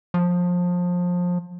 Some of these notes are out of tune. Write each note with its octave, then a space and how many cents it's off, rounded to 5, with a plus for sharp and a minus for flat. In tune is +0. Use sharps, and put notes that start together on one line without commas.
F3 +25